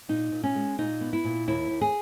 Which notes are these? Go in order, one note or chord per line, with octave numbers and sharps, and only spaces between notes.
A#2 D#4
A#2
C#4
G#3
A#2 D#4
B3
E4
A#2
D#2 E4
D#2
G#4